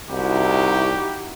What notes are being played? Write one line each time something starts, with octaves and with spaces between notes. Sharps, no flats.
C2 D#4 E4 F#4 G4